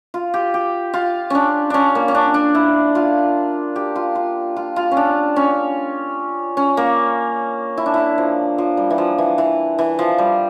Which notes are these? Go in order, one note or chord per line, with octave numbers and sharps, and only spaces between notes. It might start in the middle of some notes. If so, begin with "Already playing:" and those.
F4
G4
G4
F4
C#4 D4
C#4 D4
A#3
C#4
D4
D4
E4
F4
G4
F4
F4
F4
F4
C#4
D4
C#4
C#4
A#3
E4
D4
E4
F3
F3
G3
E3
F3
E3
E3
E3
F3
G3